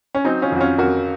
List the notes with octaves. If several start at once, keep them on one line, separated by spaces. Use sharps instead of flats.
C#4
F#3 C4 D#4
C#4 F4
F2 F#4
C#4 F4
F2 F#4 A#4